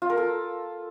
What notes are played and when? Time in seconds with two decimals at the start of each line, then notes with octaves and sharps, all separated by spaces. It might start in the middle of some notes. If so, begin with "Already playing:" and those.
0.02 F4
0.10 A#4
0.17 A4